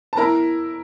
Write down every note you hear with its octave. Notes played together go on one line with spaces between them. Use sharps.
A5
E4 A#4 A#5